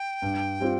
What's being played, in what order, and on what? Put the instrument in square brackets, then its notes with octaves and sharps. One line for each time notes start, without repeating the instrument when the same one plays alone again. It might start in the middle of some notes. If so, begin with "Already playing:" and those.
Already playing: [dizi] G5
[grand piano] G2
G3 C4 F4